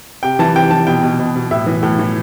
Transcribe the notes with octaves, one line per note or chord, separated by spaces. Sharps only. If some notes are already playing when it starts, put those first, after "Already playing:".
C3 G5
E3 A5
C3 G5
E3 A5
B2 G5
B2
B2
B2
A2 E5
E3
A2
E3